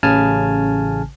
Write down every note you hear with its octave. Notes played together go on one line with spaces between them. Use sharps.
A1 C#3 G#5 A5 F6